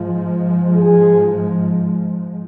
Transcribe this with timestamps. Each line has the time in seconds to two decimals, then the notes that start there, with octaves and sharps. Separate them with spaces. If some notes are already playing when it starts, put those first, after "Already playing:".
Already playing: G#2 F3 G#3 F4
0.76 G#4